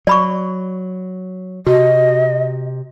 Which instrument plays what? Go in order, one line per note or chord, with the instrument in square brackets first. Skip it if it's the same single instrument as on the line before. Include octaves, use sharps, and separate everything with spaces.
[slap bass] F#3 [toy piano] D5 B5 C#6
[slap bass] C3 [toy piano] F#4 [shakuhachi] D#5